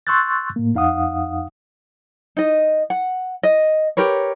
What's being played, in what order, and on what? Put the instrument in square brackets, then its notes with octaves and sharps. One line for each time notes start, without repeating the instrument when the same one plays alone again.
[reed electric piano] C6 C#6 E6 F#6 G6 A6
A2 A#3
F2 D#4 F5 F#5 D#6
[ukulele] D#4 D#5
F#5
D#5
G4 A#4 B4 C#5